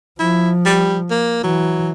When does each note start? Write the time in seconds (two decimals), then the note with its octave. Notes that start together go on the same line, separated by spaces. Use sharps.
0.20 F3 E4
0.66 G3
1.10 A#3
1.43 E3 F#3